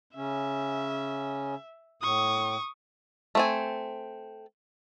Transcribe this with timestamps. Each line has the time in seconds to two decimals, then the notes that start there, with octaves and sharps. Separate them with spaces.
0.16 C#3 C#4 E5
2.02 A2 C#6 D#6
3.35 A3 C4 G#5